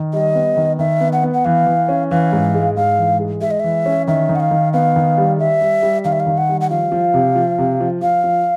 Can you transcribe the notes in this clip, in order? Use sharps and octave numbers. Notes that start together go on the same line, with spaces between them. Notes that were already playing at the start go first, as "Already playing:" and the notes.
Already playing: D#3
G3 D#5
B3
D#3
D#3 E5
B3
F#5
B3
F#5
E3 F5
E3
C#4
E3 F5
G#2
G#3
G#2 F5
E3
G#3
G#3 E5
D#5
E3 E5
C#4
D#3 E5
D#3
F#5
F5
D#3
B3 F5
D#3
G3
G3 E5
G3
G3
D#3 F5
E5
F5
D#3
F#5
G3
F#5
F3 F5
F3
C3
F3
C3
F3
F3 F5
F3